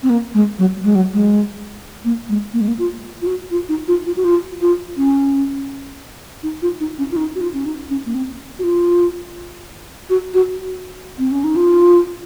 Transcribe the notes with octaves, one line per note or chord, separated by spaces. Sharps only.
C4
A#3
G#3
F#3
G#3
F#3
G#3
A#3
G#3
A#3
G#3
A#3
F4
F4
F#4
F4
D#4
F4
F4
F#4
F4
F4
C#4
D#4
F4
D#4
C#4
F4
D#4
F#4
F4
C#4
D#4
C#4
A#3
C4
F#4
F4
F#4
F#4
C4
C#4
D#4
F4